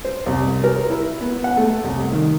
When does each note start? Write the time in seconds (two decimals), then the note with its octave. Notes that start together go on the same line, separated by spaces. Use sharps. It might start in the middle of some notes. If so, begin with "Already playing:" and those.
0.05 C5
0.26 C2
0.64 A#4
0.90 E4
1.21 B3
1.44 F#5
1.57 A3
1.84 C2
2.12 D#3